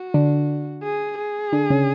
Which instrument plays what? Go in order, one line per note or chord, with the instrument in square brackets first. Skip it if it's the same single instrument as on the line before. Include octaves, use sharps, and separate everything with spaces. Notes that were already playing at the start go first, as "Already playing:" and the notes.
Already playing: [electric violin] F#4
[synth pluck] D3 D4
[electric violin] G#4
G#4
[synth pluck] D3 D4
C#3 C#4